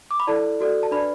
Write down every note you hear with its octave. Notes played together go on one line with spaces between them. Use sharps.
D6
B5
E4 A4 D5 A5
F#4 A4 D5
A5
D4 B4 D5 B5